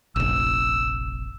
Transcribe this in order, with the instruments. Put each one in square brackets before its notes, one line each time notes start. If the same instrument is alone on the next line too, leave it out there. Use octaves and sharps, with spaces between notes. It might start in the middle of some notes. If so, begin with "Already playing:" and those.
[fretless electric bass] F1 A#1 [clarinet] E6